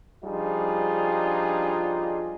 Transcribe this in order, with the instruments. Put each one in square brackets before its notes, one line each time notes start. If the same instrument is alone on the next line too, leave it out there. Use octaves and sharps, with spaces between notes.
[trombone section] F3 G3 D4 D#4 F4 G#4